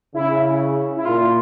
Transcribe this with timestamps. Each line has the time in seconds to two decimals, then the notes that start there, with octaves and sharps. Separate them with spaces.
0.14 C#3 E4
0.96 E4
1.05 A#2 F4